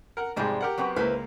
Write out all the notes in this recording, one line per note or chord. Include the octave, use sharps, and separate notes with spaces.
A#4 F#5
F2 G#2 C3 G3 G#3
G4 A#4 F#5
F#3 B3 C4
C#2 A#3 E4 B4 C5